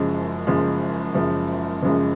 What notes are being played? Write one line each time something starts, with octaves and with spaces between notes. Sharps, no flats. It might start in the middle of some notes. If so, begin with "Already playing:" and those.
Already playing: F#1 F#2 F3 G#3
F#1 F#2 F3 G#3
F#1 F#2 F3 G#3
F#1 F#2 F3 G#3